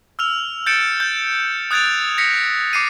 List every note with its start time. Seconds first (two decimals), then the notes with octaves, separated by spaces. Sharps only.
0.19 E6 F6 F7
0.66 G6 A6 C#7 D7 E7
1.00 G6 A6
1.71 D#6 F#6 G#6 A6 D7 F7
2.18 G#6 A#6 B6 C#7
2.73 D6 C7 C#7 D#7